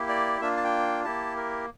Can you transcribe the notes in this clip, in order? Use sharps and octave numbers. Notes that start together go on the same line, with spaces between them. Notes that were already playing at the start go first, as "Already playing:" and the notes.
Already playing: A#3 E4 G4
D5
A#3 D4 F4 E5
A5
G5
A#3 E4 G4 A5
A#4